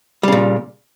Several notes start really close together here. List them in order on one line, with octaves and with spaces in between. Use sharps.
G3 C#3 A#2